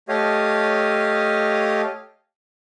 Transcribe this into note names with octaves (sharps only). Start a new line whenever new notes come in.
A3 G4 C#5 D#5 F5 D#6